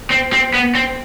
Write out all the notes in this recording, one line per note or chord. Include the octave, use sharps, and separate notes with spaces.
C4
C4
B3
C4